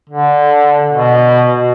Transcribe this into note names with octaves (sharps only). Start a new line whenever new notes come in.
D3
B2
B2